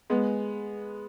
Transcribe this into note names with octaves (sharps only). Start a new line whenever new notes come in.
G#3 B3